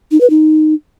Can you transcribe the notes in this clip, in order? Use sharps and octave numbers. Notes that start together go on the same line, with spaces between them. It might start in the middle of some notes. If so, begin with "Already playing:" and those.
D#4
B4
D#4